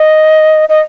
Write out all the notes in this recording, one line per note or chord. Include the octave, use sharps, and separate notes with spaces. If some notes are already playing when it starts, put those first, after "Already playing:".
Already playing: D#5
D#5